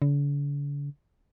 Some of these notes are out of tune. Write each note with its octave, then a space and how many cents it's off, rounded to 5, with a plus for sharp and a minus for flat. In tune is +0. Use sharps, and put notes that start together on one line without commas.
D3 -45